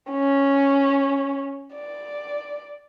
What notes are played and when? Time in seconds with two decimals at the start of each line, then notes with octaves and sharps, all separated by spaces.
0.11 C#4
1.75 D5